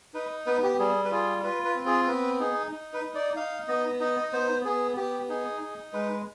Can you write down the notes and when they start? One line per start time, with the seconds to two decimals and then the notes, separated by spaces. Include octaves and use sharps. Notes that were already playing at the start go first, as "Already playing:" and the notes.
0.14 D#4 B4
0.46 B3 B4
0.63 G4
0.79 G3 G#4
1.05 B4
1.11 F4 G#4
1.43 F4 B4
1.65 B4
1.75 C4
1.86 G#4
2.07 B3 B4
2.40 D#4 G#4
2.72 D#4
2.93 B4
3.04 D#4
3.15 D5
3.36 D#4 F5
3.68 B3 D#5
4.00 D#4 D#5
4.33 B3 C5
4.65 B3 G#4
4.96 B3 G4
5.29 D#4 G#4
5.61 D#4
5.93 G#3 B4